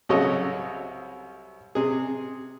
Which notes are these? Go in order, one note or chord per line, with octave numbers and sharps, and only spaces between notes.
C2 C#3 F#3 A4 C#5 D#5
C3 G#4